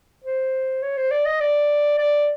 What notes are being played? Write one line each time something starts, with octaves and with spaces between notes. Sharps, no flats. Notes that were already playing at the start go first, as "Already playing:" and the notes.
C5
C#5
C5
D5
D#5
D5
D5